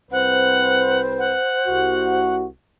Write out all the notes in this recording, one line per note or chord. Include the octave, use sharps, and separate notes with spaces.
C2 C4 B4 C5 F#5
F#5
C2 F#4